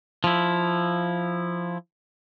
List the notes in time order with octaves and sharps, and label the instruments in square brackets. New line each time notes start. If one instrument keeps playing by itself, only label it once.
[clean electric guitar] F3 E4